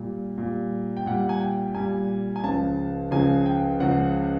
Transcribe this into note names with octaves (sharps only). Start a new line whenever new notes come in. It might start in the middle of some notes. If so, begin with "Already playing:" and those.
Already playing: A#2 G3
A#2
G3
G5
A#2 G3 F#5
G#5
G5
A#2 G3 G#5
G#5
C#2 C#3 F3 A5
C#2 C#3 F3 G#5
G5
C#2 C#3 F3 F#5